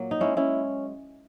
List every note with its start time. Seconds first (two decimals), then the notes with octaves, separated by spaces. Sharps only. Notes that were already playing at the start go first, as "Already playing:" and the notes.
Already playing: A#2 F#3 A#3
0.11 D#4
0.20 G#3 C#4 E4
0.37 C#4 E4